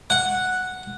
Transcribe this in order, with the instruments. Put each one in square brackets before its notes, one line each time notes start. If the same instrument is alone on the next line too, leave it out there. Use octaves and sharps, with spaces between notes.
[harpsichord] F#5